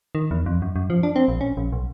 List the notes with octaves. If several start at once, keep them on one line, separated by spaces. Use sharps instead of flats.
D#3
E2
F2
F#2
F#2
F3
D4
C4
A#1
C#4
A#1
B1